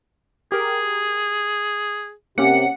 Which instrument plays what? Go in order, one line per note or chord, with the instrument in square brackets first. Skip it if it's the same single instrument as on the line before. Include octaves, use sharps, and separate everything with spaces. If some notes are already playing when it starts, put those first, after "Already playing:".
[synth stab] G4 A#4 [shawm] G#4
[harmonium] C3 [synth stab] A#3 C#4 G4 [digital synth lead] F#5